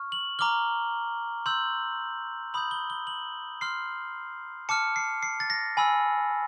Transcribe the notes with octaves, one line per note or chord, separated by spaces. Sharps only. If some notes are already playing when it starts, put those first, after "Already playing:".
Already playing: C#6 F6
F#7
A#5 D6 F6 G7
C6 E6 G6 F#7
B5 D#6 G6 F#7
G7
G7
F#7
C6 F6 C7
A5 D6 F6 C#7
C7
C7
A6
A#6
G#5 B5 E6